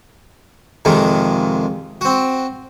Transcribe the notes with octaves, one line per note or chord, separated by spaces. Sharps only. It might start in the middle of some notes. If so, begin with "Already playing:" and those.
F2 C3 D#3 G#3
C4 F#4